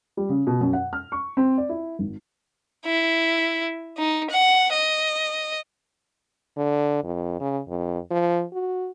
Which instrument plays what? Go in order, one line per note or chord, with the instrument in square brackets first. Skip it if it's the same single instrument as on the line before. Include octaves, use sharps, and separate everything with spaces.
[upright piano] G3
C#3
B2
F#2
F#5
F6
C#6
C4
D5
E4
G#1
[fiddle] E4
D#4
F#5
D#5
[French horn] D3
F2
C#3
F2
F3
F#4